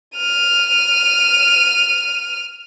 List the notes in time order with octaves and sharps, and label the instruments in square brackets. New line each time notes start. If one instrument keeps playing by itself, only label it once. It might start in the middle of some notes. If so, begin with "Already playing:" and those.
[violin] F6 D#7